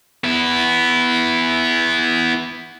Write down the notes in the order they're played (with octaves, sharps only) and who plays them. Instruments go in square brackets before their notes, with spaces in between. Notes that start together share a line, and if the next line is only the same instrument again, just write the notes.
[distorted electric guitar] B3 E4